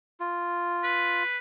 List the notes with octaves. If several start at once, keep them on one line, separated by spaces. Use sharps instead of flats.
F4
B4